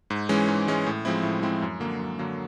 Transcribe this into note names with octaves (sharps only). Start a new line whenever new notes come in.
G#2
E3 G#3 C#4
G#2
E3 G#3 C#4
A2
F3 G#3 C4 E4
A2
F3 G#3 C4 E4
F#2
D3 F#3 A#3
F#2
D3 F#3 A#3